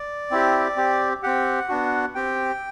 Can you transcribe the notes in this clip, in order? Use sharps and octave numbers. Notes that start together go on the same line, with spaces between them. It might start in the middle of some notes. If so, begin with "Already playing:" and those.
Already playing: D5
C4 E4 G4
C4 G4
C4 G4 F#5
B3 D4 F#4
C4 G4 G5